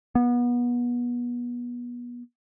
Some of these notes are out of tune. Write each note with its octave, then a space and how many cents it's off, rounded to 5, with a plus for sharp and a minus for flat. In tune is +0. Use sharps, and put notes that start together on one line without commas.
B3 -30